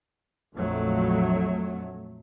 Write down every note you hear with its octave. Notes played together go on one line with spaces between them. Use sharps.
A#1 F2 F#3 A3